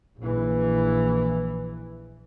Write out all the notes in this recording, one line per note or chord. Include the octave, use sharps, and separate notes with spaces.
A#1 E3